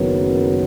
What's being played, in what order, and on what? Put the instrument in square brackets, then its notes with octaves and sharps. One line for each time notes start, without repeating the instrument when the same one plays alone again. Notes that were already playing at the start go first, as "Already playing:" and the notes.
Already playing: [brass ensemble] F#1 F#2 D#3 F#3 B3